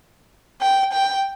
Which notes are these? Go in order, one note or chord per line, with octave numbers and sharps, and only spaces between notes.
G5
G5